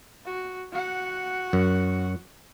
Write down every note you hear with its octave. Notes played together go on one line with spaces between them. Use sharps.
F#4
F#4 F#5
F#2